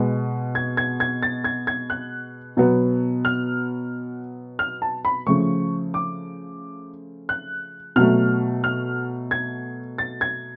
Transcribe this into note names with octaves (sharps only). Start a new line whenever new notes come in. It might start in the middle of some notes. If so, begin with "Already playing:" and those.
Already playing: B2 G#3 B3
G#6
G#6
G#6
A6
G#6
G#6
F#6
B2 F#3 B3
F6
F6
A5
B5
C#3 F3 A3 C#6
D6
F#6
B2 F#3 A3 F6
F6
G#6
A6
G#6